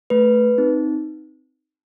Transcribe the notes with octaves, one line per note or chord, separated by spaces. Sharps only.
A3 B4
C4 D#4